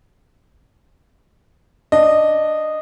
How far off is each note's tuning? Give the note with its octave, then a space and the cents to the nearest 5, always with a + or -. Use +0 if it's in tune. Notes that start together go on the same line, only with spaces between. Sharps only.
D4 +5 D#5 -10